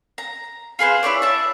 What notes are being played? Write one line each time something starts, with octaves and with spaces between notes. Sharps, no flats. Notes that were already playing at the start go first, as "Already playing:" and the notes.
A#5
F4 G#4 B4 C5
E4 B4 C#5 D5
E5 A5